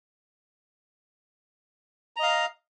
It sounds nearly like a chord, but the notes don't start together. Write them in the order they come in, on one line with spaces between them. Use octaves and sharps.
A#5 D#5 F5